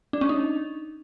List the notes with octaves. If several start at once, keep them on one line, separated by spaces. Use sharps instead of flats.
D4
C#4
D#4